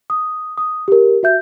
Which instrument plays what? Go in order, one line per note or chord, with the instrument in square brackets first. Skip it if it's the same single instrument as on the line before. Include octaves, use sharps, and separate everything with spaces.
[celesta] D#6
D#6
G4 A#4
F#4 E5 G6